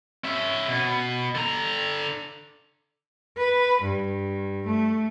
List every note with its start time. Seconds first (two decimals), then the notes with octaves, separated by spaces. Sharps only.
0.24 C#4 E5
0.68 B2
1.35 D3 A#5
3.37 B4
3.82 G2
4.66 A3